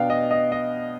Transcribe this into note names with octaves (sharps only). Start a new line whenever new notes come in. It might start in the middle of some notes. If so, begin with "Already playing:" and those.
Already playing: B2 B3 D4 F5 G5
D#5
D#5
D#5